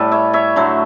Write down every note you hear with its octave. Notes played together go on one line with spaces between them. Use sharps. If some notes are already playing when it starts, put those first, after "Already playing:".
Already playing: A2 G3 A4 B4
C#5 E5
C#5 E5
D3 F#3 A3